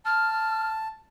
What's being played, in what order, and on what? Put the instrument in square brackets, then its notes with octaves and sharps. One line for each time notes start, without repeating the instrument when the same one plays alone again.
[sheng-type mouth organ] A5 [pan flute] F6